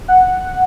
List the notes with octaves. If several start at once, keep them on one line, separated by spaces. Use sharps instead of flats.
F#5